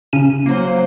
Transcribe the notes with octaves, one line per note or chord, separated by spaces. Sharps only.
C#3 C#4 D#7
F#3 A#3 C5